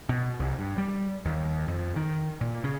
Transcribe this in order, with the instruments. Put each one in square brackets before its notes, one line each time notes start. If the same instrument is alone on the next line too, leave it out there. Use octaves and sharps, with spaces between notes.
[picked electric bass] B2
C2
G2
G3
D#2
F2
D#3
A#2
C#3